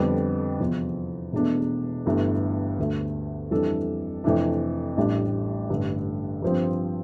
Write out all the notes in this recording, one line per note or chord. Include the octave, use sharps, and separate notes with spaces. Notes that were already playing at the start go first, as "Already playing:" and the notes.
Already playing: F2 D3 G3 B3 D4
E2 C3 F3
E1 E2 B2 A3 D4
G1 G2 E3 A3
D2 D3 A3
F2 E3 G3 D4 A4
F2 C3 E3 A3 D4
A1 A2 G3 D4 G4
A1 G2 D3 A3
G2 F3 C4